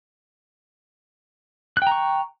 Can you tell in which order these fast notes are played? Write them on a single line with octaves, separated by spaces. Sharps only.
F#6 G5 A#5 C#6